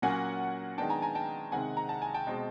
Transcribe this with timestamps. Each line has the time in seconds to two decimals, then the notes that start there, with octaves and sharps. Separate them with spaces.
0.02 A#2 F#3 A#3 C#4 F#5 G#5
0.78 D#3 G#3 B3 D4 G5 A5
0.89 G#5 A#5
1.02 G#5 A#5
1.15 G5 A5
1.52 C3 D#3 G#3 C4 F#5 G#5
1.77 A#5
1.89 A5
2.02 G#5
2.14 G5 A5
2.27 B2 G#3 C4